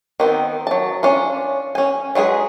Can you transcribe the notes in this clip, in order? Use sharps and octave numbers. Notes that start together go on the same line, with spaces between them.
D#3 B3 C4
F#3 A5
C#4 D4 F4
C#4 G#5
F#3 G#3 F4 G#4 B4